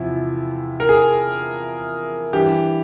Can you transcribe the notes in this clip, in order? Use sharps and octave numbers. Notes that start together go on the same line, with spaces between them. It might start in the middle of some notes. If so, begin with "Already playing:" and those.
Already playing: E2 C3 F3 E4
A#4
G#4
G2 E3 G4